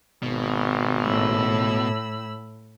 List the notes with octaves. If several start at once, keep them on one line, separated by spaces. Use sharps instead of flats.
G#1 B2
A2 B5 E6